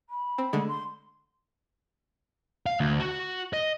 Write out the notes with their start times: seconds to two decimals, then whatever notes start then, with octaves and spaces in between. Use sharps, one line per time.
0.09 B5
0.38 C4
0.53 D3 G#3 A3
0.68 C6
2.66 F5
2.80 D2
3.00 F#4
3.53 D#5